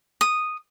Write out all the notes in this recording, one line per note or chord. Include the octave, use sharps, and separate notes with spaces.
D#6